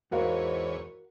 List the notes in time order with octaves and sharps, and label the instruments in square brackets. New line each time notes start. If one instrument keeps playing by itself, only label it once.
[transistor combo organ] E2 C#5 [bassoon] G#2 [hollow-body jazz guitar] F#4 A#4 F5